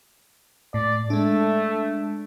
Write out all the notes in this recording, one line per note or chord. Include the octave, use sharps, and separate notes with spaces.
A2 D5
G#3 A3 D4